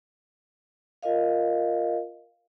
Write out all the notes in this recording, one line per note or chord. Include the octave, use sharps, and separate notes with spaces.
F4 A#4 D#5 F5